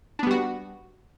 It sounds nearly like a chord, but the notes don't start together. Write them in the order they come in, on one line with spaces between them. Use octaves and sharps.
D4 B3 G3 F#4